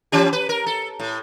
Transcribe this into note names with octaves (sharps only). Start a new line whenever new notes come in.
E3 C#4 G4
B4
A#4
A4
A2